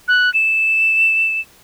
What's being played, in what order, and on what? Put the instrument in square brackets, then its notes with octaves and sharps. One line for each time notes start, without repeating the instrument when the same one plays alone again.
[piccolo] F#6
E7